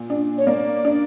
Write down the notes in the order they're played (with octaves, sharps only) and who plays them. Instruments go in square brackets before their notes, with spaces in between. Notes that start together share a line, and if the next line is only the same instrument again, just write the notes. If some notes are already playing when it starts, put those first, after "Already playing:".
Already playing: [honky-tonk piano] A#2
D4
[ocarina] C#5
[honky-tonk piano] A#3 [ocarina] D5
[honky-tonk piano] D4